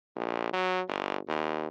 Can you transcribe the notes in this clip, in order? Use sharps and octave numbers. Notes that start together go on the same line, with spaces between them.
A#1
F#3
G1
D#2